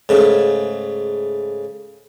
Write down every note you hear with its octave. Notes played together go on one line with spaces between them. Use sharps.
G#2 C#3 A3